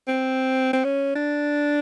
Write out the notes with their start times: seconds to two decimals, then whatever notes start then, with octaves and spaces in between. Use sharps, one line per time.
0.08 C4
0.73 C4
0.85 C#4
1.16 D4